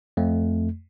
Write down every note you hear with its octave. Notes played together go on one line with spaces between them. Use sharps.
F2 A3